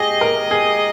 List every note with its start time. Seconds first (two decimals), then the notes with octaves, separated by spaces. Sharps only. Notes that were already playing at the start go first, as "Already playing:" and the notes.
Already playing: G4 G#4 D#5
0.21 A#4
0.51 G#4